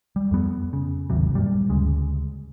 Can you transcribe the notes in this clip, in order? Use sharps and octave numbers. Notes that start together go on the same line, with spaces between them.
G3
F2 B3
C#3
G#1 D#2 C3 F#3
G2 A#2 G3
D2 C#3 G#3